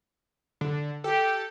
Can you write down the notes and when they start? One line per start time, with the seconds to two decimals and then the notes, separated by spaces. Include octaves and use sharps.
0.61 D3
1.04 G4 A4